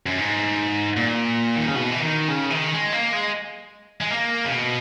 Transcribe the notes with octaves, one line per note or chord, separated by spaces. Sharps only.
F#2
G#2
A#2
D#3
C#3
B2
E3
D#3
C#3
E3
D#3
G#3
A#3
G#3
G#3
A#3
C#3
B2